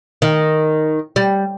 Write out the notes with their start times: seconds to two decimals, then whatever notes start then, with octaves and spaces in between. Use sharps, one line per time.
0.22 D#3
1.16 G3